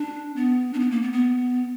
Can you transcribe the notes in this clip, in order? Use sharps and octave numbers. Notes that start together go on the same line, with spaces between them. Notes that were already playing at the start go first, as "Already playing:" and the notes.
Already playing: D4
B3
D4
B3
A#3
B3
B3